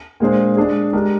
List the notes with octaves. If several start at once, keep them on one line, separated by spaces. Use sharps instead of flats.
A#2 G#3 D4 G#4 C5
G#3 D4 G#4
G#3 D4 G4 A#4